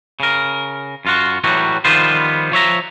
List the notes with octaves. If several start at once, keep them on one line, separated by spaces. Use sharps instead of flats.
C#3 A#4
F#2 F4 F#4
A2 E3 F#3 G3 F#4
D#3 F3 G3 B3 F4 C5
F3 C#5 E5 A#5